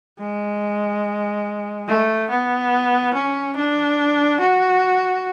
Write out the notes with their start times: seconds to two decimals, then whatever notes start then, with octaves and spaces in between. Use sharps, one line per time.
0.19 G#3
1.88 A3
2.30 B3
3.14 C#4
3.56 D4
4.40 F#4